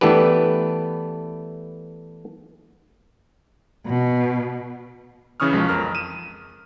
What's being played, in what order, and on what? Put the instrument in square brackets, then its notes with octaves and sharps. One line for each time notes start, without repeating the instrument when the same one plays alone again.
[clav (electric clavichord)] E3 A3 B3 D4 G4 B4
[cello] B2
[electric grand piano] C#3 E3 C#4 C#6 D#6 F6
B1 F3 G#3
F2 A#4 F6
D#7 E7